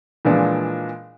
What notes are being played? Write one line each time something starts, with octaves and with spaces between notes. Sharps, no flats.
A#2 E3 F3 G#3 D4